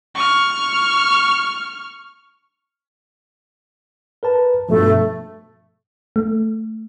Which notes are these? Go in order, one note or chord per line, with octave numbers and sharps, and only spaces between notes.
C#6 F6
A#4 B4 A5
G2 B2 F3 A3
A3